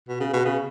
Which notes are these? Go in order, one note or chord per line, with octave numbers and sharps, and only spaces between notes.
B2
C#3
B2
C#3